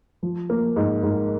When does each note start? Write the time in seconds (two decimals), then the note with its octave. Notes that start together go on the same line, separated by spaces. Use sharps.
0.23 F3
0.50 A#3
0.76 G#2
1.03 G#2